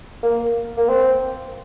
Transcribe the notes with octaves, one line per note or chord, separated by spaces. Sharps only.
A#3
A#3
C4